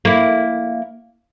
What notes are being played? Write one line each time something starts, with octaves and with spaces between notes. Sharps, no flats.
A#3 E4